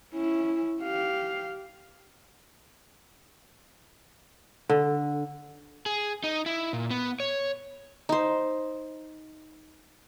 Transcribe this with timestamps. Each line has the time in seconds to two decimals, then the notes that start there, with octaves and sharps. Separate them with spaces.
0.14 C#4 E4
0.82 G4 F5
4.69 D3
5.86 G#4
6.24 D#4
6.46 E4
6.73 A#2
6.91 B3
7.20 C#5
8.09 D#4 C5